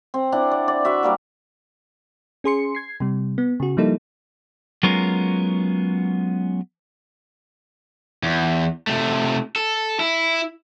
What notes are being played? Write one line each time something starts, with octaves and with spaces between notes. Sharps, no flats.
C4
C4 D4 E4 F#5
D5
D5
E3 F#4 E5
G3 A#3 D5
C#4 G#4 C6 C#7
G#6 C7
C3 G3
B3
C#3 F#4
F3 G3 A#3 D#4 E4 A4
F#3 G#3 B3 C#4 F4 A#4
E2
C3 A3
A4
E4